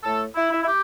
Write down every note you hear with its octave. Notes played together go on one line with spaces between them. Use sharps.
A2 A3 A4
E4
E4
E4
G4